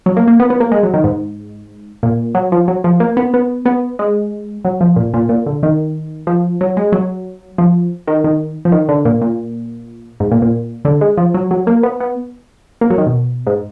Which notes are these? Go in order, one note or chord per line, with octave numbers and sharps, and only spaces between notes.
F#3
A#3
A#3
B3
B3
A#3
G#3
F#3
D#3
G#2
A#2
F#3
F3
F#3
F3
A#3
B3
B3
B3
G#3
F#3
F3
A#2
A#2
A#2
D3
D#3
F3
F#3
G#3
F#3
F3
D#3
D#3
F3
D#3
D3
A#2
A#2
G#2
A#2
A#2
D3
G#3
F3
F#3
F#3
A#3
B3
B3
A#3
F#3
D#3
B2
G#2